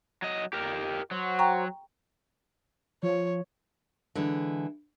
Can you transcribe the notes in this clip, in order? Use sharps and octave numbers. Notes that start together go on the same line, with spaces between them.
F#3 D#5
F2 G3 G4 A#4
F#3 F#4 C5 F#5
G5 A#5 C#6
F3 C#5
D3 E3 G#3